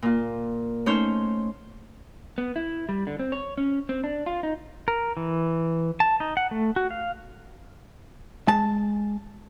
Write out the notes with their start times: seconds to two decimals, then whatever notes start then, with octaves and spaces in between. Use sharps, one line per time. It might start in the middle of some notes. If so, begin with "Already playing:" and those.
0.02 A#2 F4
0.86 A3 C#4 D#4 C5 C#5 G6
2.38 B3
2.56 E4
2.89 G3
3.07 D3
3.19 C4
3.32 C#5
3.58 C#4
3.89 C4
4.04 D4
4.26 F4
4.43 D#4
4.88 A#4
5.17 E3
6.00 A5
6.20 D#4
6.37 F#5
6.51 A3
6.76 F#4
6.91 F5
8.48 G#3 A5